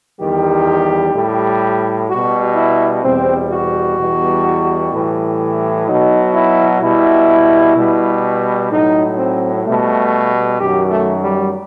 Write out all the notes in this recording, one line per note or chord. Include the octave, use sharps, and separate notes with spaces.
E2 D#3 G3 G4
A2 G3
B2 G3 F#4
E4
E2 B2 G3 C4
F#4
E2 B2 G3
A2 E3 G3
B2 F#3 D#4
E4
B2 G3 E4
B2 G3
A2 F#3 D#4
C4
B2 G3 A3
F#2 D#3 F#3 G4
A3
G3